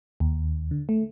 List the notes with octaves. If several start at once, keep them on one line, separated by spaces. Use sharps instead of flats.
D#2
D3
A3